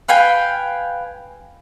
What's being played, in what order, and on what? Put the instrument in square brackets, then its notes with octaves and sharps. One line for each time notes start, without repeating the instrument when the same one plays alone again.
[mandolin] B4 F5 G5 G#5